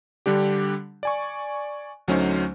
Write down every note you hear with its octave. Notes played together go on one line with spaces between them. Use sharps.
D3 G3 D4 G4
D5 G#5 C#6
D2 F#3 A3 C#4 D#4 C5